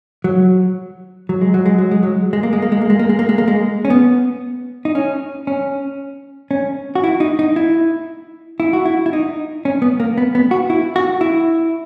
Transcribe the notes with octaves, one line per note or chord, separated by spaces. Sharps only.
F#3
F#3
G#3
F#3
G#3
F#3
G#3
F#3
G#3
A#3
G#3
A#3
G#3
A#3
G#3
A#3
G#3
A#3
G#3
A#3
G#3
C#4
B3
D#4
C#4
C#4
C#4
F#4
E4
D#4
D#4
E4
E4
F#4
E4
E4
D#4
C#4
B3
A#3
B3
B3
F#4
E4
F#4
E4